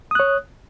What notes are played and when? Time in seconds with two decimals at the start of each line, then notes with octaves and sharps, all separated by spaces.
0.11 D#6
0.15 F#6
0.20 C#5